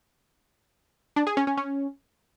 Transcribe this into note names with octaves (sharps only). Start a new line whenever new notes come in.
D4
G#4
C#4
C#4
C#4